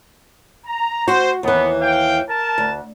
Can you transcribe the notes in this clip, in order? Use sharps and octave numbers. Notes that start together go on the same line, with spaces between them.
A#5
F#4 C5
D#2 E3 B3
F5 G5
A#4 A5
D2